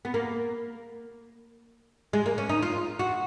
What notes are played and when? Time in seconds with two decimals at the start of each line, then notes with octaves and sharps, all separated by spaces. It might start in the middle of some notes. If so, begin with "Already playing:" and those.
0.05 B3
0.14 A#3
2.13 G#3
2.26 A#3
2.38 C#4
2.49 D#4
2.62 F4
2.99 F#4